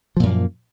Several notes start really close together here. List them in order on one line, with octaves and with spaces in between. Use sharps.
F3 A#2 F#2 A#3